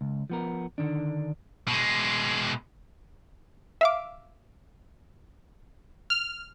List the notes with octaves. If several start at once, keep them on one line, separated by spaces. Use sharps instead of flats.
C#2
F3 B3 A#4
D3 D#3 D4
B2 G#3
E5 F5 D6
F6